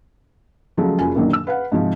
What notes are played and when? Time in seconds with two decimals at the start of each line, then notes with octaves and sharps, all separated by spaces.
0.77 C#3 F3 F#3 G#3 A3
0.99 F#1 F4 G#5
1.15 F#2 A#2 D3 D#3 F#3
1.33 E6
1.47 B4 F5 F#5
1.72 G#2 C3 F3 G#3